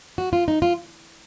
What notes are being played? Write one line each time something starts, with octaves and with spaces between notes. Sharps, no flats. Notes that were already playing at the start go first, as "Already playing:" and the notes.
F#4
F4
D#4
F4